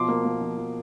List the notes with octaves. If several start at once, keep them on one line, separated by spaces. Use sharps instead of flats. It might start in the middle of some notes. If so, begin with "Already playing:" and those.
Already playing: B2 F3 C6 D6
A#3
A#3
F3
F3